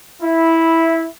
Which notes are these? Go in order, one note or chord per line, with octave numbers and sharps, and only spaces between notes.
E4